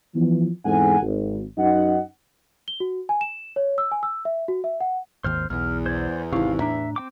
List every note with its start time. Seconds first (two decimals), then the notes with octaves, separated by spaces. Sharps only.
0.15 E3 F3 B3
0.65 E2 G#2 C4 A4 F#5 G#5
1.02 G#1
1.58 F#2 D#4 D#5 F#5
2.68 G7
2.80 F#4
3.09 G#5
3.21 E7
3.56 C#5
3.78 E6
3.91 G#5
4.03 E6
4.25 E5
4.48 F#4
4.64 E5
4.81 F#5
5.24 G#1 D#2 C5 F6
5.50 B1 E2 F6
5.86 C5 D5 G#6
6.33 G#1 C3 D#4 E4 F5 C#6
6.60 A2 D4 E5 A#5
6.96 C4 G5 D6